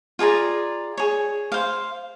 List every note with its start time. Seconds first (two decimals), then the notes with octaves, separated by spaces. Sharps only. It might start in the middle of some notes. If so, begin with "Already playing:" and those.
0.19 F4 G#4 D5 A#5
0.98 G#4 C#5
1.52 C5 F5